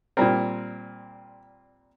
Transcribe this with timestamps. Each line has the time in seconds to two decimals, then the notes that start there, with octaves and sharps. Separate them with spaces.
0.17 A#2 G3 C4 A#4